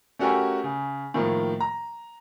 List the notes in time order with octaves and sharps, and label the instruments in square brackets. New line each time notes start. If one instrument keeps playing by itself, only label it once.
[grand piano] A3 C#4 F#4 G4 A#4 G#5
C#3
A2 D#3 F3 A#3
A#5